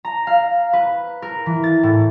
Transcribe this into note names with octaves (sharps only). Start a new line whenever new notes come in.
A#5
F5
B4
A#4
E3
A6
A2